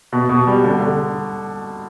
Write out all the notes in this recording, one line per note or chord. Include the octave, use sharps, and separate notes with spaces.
B2
B2
G3
D3
D3